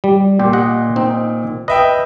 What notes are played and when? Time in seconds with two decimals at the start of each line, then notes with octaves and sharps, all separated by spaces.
0.04 G3
0.40 A#2 G4
0.53 D#5 F#5
0.96 C4 D#4
1.68 B4 D#5 E5 G5